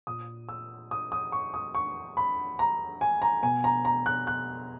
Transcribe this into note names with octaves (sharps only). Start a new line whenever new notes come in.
A#2 D#6
E6
D#6
D#6
C#6
D#6
C#6
B5
A#5
G#5
A#5
B2 G#5
A#5
A#5
F#6
F#6